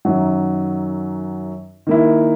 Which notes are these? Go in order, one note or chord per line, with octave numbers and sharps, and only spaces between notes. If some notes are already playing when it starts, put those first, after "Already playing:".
F#2 D#3 F#3
D#3 A#3 E4